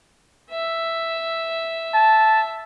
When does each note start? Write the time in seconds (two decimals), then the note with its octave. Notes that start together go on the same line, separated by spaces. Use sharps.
0.50 E5
1.94 A5